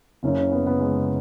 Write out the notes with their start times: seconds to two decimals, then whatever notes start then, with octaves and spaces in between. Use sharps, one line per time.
0.23 F#1 F#2 C#3 C#4
0.38 C#4
0.52 B3
0.66 B3
0.81 G#3